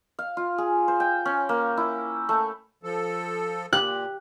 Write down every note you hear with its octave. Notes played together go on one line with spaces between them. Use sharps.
F5
F4
G#4
C5
G5
C#4
A#3
E4
A3
F3 A4
A#2 G4 F#6